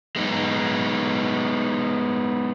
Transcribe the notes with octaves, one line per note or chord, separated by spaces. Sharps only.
G#3 B3 D#4